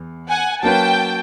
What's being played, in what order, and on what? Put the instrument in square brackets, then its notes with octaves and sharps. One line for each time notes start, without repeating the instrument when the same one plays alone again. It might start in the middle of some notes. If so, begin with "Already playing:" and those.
Already playing: [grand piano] E2
[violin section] F#5 G#5
[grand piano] F#3 A#3 C#4 F#4 B4 [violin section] G5 A5